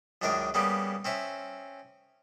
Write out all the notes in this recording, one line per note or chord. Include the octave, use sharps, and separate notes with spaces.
C#2 F#2 D#3 D4 A#4
C#3 G3 A#3 B3
C4 C#4 E5